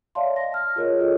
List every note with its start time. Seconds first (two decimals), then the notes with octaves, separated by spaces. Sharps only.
0.15 C#5 D5 E5 F5 A5 C6
0.36 D#5 A#6
0.52 A5 F6
0.76 F4 G#4 A#4 C#5 D#5
0.99 F4 F#4 G#4 A4 C#5 D#5